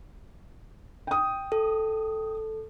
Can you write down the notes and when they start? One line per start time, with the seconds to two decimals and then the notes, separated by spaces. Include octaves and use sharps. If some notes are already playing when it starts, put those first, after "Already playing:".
1.07 G5 D#6
1.52 A4